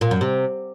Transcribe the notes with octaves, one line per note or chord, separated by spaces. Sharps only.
A#2
F#2
C3